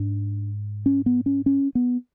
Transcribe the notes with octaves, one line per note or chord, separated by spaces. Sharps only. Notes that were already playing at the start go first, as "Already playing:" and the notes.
Already playing: G#2 D4
C#4
B3
C#4
C#4
B3